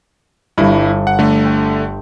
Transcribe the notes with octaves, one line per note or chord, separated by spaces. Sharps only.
G1 G2 E4 D6 A#6
F#5
D3 A3
G5 C6